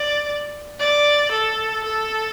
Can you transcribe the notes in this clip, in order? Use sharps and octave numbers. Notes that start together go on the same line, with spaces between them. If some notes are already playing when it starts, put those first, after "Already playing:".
Already playing: D5
D5
A4
A4